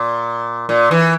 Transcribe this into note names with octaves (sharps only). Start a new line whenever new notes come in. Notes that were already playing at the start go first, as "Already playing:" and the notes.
Already playing: A#2
A#2
E3